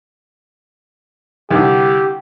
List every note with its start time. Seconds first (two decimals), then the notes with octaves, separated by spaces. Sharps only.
1.50 C2 D3 G4